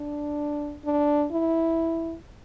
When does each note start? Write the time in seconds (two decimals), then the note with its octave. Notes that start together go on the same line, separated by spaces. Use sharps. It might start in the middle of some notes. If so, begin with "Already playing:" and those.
Already playing: D4
0.85 D4
1.31 E4